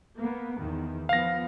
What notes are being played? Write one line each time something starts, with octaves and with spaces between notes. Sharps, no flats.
A#3 B3
E2 D#3
F3 B3 F5 A#6